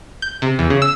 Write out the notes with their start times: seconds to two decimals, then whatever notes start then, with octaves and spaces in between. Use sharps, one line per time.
0.22 G6
0.42 C3
0.59 E2
0.70 C#3
0.82 E6